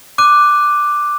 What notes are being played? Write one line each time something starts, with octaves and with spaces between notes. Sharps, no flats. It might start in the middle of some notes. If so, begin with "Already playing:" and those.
D6 F#6 D#7